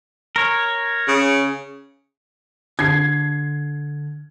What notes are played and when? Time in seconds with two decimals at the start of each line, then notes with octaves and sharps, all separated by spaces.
0.36 A#4 C#5
1.08 C#3
2.79 D3 G#6 C7